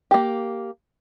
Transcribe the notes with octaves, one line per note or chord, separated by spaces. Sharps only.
A#3 G4